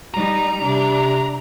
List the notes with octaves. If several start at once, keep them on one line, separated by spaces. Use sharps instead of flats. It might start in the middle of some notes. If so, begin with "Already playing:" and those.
G3 D#4 A#5
C3 D4